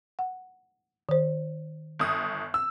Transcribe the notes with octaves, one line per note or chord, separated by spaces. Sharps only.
F#5
D#3 C5
G1 D#6
E6